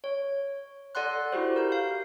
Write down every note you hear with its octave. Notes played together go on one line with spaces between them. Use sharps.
C#5
A4 D5 F#5 C6 F#6
E4 F#4 G4 C5
A#4 G6
F5